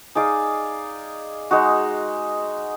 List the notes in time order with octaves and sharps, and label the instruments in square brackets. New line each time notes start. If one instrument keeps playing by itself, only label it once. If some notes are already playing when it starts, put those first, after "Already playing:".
[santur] D#4 G#4 D5 F5
G#3 D#4 F#4